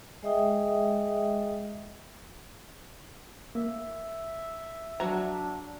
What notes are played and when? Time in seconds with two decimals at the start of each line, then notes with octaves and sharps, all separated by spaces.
0.23 G#3 G#4 D#5 E5 G5 D#6
3.55 A#3 E5
5.00 F#3 D4 F#4 A#5